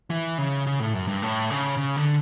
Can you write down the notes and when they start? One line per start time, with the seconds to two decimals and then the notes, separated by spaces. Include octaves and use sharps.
0.10 E3
0.38 C#3
0.67 C#3
0.80 A2
0.94 F#2
1.08 G2
1.22 A2
1.50 C#3
1.77 C#3
1.96 D3